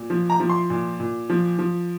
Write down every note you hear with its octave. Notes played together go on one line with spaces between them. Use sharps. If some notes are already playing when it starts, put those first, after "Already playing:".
Already playing: A#2
F3
A#5
F3
C6
A#2
A#2
F3
F3